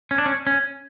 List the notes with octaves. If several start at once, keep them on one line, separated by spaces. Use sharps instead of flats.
C#4
D4
C#4
C#4